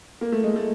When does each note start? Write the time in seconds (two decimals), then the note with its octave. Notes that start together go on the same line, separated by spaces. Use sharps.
0.21 A#3
0.32 A3
0.44 G#3
0.56 A3